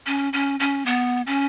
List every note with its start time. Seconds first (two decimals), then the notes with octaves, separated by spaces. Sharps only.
0.07 C#4
0.33 C#4
0.60 C#4
0.86 B3
1.27 C#4